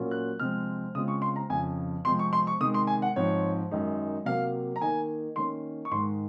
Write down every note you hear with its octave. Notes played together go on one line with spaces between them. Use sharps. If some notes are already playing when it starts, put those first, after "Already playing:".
Already playing: A#2 F#3 A#3 C#4 F4
F#6
C3 F3 G#3 C4 F6
C#3 G#3 C4 F4 D#6
C#6
C6
A#5
F2 C#3 F3 G#5
C3 F3 G#3 C4 C6
C#6
C6
C#6
C3 D#3 G#3 D#6
C6
G#5
F#5
G#2 F3 C4 C#5
F#2 D#3 G#3 D#4
C3 F#3 A#3 F5
A#5
D#3 A#3 D#4 G#5
D#3 A#3 C#4 C6
C#6
G#2 D#3 G#3 C6